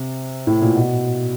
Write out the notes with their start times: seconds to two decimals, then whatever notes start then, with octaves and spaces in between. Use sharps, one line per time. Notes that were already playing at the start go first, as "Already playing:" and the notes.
Already playing: C3
0.47 A2
0.62 A#2
0.75 B2